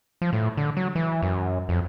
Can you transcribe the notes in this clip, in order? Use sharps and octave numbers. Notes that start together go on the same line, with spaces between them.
F3
A2
D3
F#3
E3
F#2
F2